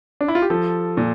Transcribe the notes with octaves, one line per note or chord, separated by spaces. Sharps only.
D4
E4
F4
G4
F3 A4
A#2